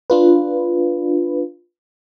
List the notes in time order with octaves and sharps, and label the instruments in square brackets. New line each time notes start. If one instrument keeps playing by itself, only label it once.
[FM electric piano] D4 F4 B4